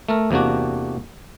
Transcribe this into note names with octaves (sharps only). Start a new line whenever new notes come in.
A3 A4 A#4
E2 C3 A#3 D4 F#4